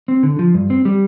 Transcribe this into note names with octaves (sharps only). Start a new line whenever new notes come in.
C4
D3
F3
G2
C4
G3